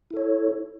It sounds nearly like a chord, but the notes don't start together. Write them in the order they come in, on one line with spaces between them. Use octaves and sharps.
E4 A4 C#5